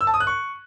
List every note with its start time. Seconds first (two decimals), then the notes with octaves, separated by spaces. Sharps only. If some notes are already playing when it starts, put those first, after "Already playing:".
0.01 E6
0.07 A5
0.14 D#6
0.20 F#6
0.27 C#6